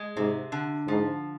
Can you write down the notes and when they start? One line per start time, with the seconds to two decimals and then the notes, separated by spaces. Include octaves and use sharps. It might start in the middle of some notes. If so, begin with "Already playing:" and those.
Already playing: G#3
0.17 G#2 C3
0.52 D3
0.88 G#2 F3